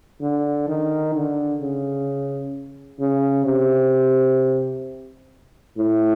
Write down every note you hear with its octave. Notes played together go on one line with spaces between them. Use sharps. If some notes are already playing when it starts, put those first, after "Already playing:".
D3
D#3
D3
C#3
C#3
C3
A2